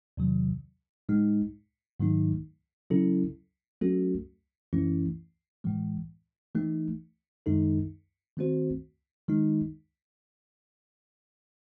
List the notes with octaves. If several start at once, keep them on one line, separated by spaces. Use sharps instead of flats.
E2 C3 D#3 F#3
A2 G#3 D#4
G#2 D#3 F#3 A3 D#4
C#3 F#3 C#4 E4 A4
F#3 A3 C#4 F#4 A4
F#2 E3 A3 C#4 E4
A2 E3 G#3
E3 A3 D#4
F#2 D#3 G#3 D#4 A4
D#3 A3 C4 F#4 C5
D#3 G#3 D#4